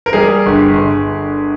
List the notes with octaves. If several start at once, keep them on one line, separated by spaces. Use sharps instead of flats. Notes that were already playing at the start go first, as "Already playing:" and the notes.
A#4
G3 G#4
G1
G1